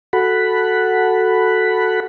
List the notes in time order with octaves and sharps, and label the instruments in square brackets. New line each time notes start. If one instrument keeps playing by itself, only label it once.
[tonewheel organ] F#4 A4 F#5 B5